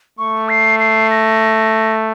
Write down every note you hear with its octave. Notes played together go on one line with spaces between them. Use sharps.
A3 C#6
C7
C7
A#6